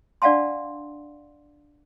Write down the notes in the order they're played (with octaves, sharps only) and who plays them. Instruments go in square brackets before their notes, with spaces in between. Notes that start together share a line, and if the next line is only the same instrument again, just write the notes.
[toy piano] D4 D5 F5 F#5 A5 C6